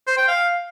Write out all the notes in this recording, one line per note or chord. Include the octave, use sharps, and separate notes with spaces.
C5
G5
F5